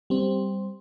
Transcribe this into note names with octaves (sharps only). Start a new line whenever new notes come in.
G3 C4